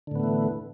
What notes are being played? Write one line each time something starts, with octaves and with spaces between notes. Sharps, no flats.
A2 D3 E3 A3 B3